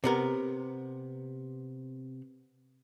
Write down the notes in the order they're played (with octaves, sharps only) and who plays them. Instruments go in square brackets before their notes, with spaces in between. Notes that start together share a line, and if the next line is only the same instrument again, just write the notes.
[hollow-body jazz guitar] C3 B3 A#4